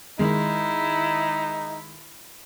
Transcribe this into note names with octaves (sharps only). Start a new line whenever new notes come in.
D#3 G#3 D#4 E4